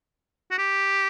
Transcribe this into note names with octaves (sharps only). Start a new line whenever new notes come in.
F#4
G4